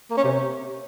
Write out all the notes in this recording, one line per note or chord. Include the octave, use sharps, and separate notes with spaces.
A#3
C#4
C3